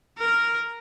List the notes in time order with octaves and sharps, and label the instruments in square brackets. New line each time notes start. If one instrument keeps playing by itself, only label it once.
[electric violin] A#4